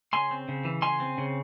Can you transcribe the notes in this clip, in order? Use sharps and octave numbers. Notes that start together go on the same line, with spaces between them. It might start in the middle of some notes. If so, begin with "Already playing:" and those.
C#3 G#5 C6
C4
C#3
E3
C#3 G#5 C6
C4
C#3